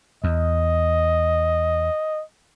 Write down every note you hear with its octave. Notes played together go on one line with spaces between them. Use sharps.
E2 D#5